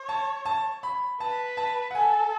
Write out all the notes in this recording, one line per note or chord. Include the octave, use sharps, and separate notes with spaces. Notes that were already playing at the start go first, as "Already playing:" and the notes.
Already playing: C#5
A5
A5
B5
B4 A5
A5
F#5
A4 G#5